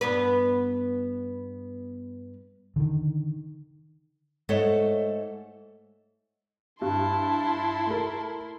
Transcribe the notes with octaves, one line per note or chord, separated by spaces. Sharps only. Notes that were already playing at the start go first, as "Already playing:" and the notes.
G2 B3 B4
D3 D#3
G#2 A3 A4 C#5 D#5 F#5
G2 E4 A5 C6
A3 A#4